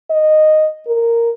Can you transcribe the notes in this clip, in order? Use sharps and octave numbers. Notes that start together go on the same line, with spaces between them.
D#5
A#4